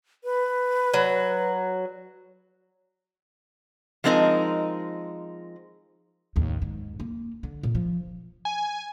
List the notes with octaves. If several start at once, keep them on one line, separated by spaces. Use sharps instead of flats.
B4
F#3
F3 G#3 C4 D#4 A#4
A1 D#2
G#2
A#3
D3
A#2
F3
G#5